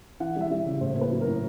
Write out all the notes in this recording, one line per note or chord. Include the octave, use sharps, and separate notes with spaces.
E3 F#5
G3
E5
G3
C#3
A2 C5
A#3
B4
F#3
A#4
A2